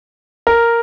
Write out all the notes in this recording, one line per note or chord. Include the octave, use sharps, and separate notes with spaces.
A#4